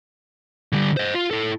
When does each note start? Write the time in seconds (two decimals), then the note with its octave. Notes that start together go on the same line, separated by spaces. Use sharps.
0.73 D3 G3
0.97 C5 D#5
1.14 F4
1.31 E4 A4